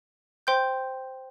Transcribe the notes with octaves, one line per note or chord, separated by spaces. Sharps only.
C5 G5 C6 G6